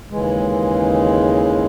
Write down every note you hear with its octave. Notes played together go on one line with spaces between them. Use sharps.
D#2 C#3 E3 G#3